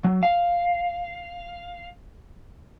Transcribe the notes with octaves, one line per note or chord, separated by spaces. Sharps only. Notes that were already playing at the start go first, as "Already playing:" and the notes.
F#3
F5